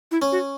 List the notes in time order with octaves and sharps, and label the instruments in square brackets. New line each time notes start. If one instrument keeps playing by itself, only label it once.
[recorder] E4
[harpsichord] C#4
[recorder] F#4